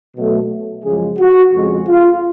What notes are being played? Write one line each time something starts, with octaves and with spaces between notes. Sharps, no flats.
B2 F#3 A3
F#2 C#3 F3 G#3 G#4
F#4
F2 C#3 G#3
F4